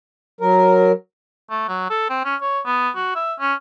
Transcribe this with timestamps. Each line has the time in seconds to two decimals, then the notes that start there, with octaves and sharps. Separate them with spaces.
0.41 F#3 A#4
1.50 A3
1.69 F#3
1.90 A4
2.10 C4
2.25 C#4
2.41 C#5
2.66 B3
2.96 F#4
3.15 E5
3.39 C#4